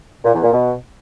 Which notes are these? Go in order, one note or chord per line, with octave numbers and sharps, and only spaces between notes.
A#2
E2
A#2
B2